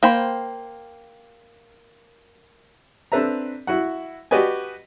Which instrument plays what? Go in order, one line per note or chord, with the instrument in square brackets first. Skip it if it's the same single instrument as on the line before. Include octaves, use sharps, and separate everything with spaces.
[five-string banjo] A#3 C5 G5 B5
[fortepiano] C4 D4 A4 B4 E5 A#5
E4 F#4 F#5
F#4 G4 B4 D5 D#5 G#5